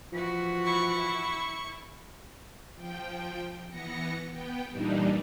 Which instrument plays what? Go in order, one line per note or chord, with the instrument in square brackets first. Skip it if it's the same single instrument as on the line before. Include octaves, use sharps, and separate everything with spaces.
[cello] E3 F#4 [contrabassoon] F3
[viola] E4 [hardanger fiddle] C#6
[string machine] F3 G5
E3 B3 A#6 C#7
B3 G5
G2 A#2 E3 G3 D4 D#4